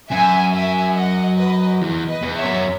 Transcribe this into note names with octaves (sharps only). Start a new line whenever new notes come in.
F#2 E5 G#5
E5 G#5
D#5 F#5
B4 D#5
E2
B4 D#5
E2
C#5 E5
F#2